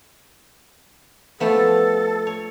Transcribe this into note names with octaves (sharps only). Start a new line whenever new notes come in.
F3 A3 B3 A4
C#5